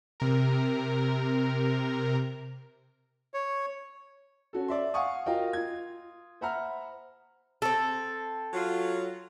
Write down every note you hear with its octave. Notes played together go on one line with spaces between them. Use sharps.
C3 A#4
C#5
C#4 F#4 A4
D5 E5 C6
F5 F#5 G#5 C#6 D#6
F4 F#4 A#4 D#5 F5 G5
F4 G#6
C5 E5 F#5 A#5 B5 F6
C4 A4
F#3 F4